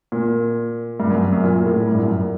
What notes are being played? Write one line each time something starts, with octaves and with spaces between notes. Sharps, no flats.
A#2
G2
F#2
F#2
A#2
A2
G2
F#2